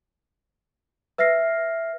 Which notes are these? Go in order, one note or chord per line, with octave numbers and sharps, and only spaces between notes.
B4 E5 F6 A#6 C7